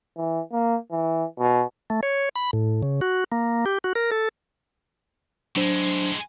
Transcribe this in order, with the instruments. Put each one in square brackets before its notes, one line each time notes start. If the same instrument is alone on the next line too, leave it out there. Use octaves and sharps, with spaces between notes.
[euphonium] E3
A#3
E3
B2
[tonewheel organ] A3
C#5
B5
A2
C#3
F#4
A#3
G4
F#4
A#4
A4
[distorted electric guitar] A2 G#3 [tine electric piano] F#3 D4 C5